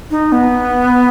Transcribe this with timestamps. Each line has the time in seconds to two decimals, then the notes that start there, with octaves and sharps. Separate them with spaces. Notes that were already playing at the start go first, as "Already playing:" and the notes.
0.11 D#4
0.32 B3